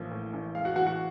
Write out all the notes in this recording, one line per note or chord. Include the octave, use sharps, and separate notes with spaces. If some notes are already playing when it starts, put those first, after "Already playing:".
Already playing: A1 A2 F3 A#3
A2
A1
G#3 F5
F#4 F#5
E3 F#4 F#5
F#4 F#5